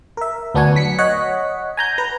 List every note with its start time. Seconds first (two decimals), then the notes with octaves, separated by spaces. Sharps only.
0.17 A#4 E5
0.55 D2 B3 D4 F#4 F#5 G#5
0.75 F#3 B6 C#7
0.99 C#5 D#5 F#5
1.77 G#5 A#5 G6
1.98 B4 A#5